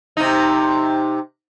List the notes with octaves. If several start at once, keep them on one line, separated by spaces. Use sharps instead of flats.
C3 D#4